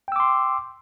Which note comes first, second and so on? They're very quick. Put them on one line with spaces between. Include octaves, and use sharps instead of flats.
G5 E6 D6 C6